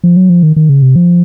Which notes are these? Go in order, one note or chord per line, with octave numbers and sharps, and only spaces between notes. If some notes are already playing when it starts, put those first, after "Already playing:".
F3
F#3
F3
D#3
D#3
C#3
C3
F3